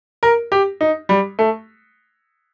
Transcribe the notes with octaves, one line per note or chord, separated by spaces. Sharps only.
A#4
G4
D#4
G3
A3